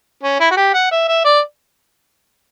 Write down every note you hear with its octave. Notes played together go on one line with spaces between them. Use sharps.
C#4
E4
F#4
G4
F#5
E5
E5
D5